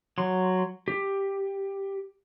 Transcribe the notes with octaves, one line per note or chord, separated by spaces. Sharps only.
F#3 C6
G4